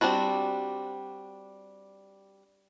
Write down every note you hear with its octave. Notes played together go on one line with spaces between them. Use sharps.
G3 C4 D4 E4 F#4